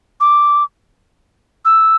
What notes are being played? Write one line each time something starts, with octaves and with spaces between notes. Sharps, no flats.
D6
E6